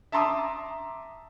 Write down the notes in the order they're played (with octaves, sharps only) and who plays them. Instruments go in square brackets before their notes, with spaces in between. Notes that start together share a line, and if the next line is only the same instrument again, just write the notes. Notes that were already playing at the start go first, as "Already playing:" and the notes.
[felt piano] E5 A5 A#5 C6 D6 D#6